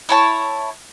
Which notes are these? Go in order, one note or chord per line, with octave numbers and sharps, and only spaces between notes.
E4 C#5 A5